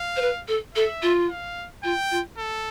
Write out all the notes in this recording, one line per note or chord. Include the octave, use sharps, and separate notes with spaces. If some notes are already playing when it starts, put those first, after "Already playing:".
Already playing: F5
C5
B4
A4
A4 E5
F4
F5
F4 G5
F4
A4